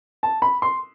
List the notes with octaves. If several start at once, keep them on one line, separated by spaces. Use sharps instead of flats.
A5
B5
C6